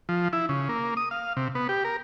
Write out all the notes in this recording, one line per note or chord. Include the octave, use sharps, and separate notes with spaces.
F3
E4
C#3
A#3
D#6
F5
C3
B3
G4
A#4